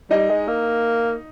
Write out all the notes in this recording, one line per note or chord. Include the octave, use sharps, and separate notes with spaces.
G3 D#4 D#5
G#3
A#3